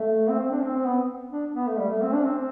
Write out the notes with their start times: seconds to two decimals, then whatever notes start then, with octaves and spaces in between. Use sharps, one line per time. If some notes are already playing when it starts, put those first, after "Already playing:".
Already playing: A3
0.29 C4
0.40 C4
0.51 D4
0.62 C4
0.75 C4
0.85 B3
1.32 D4
1.55 B3
1.67 A3
1.78 G3
1.89 A3
2.02 C4
2.14 D4
2.24 C4
2.36 C4